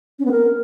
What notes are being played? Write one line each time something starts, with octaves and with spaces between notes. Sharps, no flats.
C#4
B3
A#4